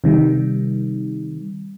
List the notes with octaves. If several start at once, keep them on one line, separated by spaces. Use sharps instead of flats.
C3 D#3 G3